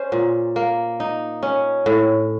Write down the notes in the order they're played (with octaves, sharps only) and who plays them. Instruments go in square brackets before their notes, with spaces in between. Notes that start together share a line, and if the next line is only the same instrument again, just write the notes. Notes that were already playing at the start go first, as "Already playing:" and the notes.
Already playing: [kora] C#4 C5
A#2
A#3
D#4
C#4
A2